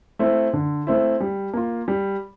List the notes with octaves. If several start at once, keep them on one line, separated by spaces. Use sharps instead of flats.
A3 C4 E4
D3
A3 C4 E4
G3
A#3 F4
G3